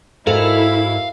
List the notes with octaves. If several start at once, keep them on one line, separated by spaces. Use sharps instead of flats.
G#2 E4 F#4 A4 A#4 F5